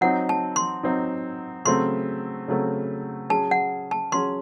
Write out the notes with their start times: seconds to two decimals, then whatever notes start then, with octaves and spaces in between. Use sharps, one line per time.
0.01 F#3 C4 D#4 F#5
0.29 A5
0.56 C6
0.83 F#3 C4 D#4
1.65 C#3 F#3 A3 C4 C6
2.48 C#3 F#3 A3 C4
3.30 F#3 C#4 G#4 A5
3.51 F#5
3.91 A5
4.12 F#3 C#4 G#4 C6